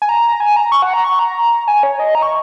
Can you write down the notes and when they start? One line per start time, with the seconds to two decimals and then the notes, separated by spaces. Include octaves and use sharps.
0.02 G#5
0.09 A#5
0.40 G#5
0.56 A#5
0.72 C#6
0.82 F#5
0.94 A#5
1.04 C#6
1.19 A#5
1.68 G#5
1.83 C#5
2.00 D#5
2.15 A#5
2.22 C#6